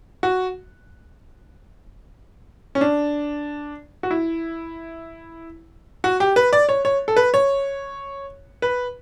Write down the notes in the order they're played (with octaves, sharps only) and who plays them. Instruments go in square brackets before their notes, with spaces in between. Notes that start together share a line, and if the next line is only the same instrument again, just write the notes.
[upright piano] F#4
C#4
D4
F#4
E4
F#4
G4
B4
D5
C#5
C#5
A4
B4
C#5
B4